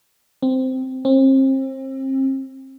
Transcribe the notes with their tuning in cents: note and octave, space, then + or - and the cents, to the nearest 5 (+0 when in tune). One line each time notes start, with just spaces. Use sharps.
C4 -10
C4 +35